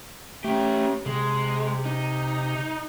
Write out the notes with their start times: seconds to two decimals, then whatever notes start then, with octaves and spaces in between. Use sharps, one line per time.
0.44 A3 C#4 G4
1.06 C3 G#3
1.85 D#4